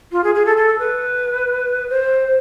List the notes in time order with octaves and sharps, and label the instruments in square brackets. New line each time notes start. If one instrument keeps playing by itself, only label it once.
[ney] F4
G#4
G#4
A4
A4
B4
C5